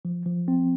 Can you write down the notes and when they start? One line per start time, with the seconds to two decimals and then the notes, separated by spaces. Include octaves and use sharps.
0.05 F3
0.26 F3
0.48 C4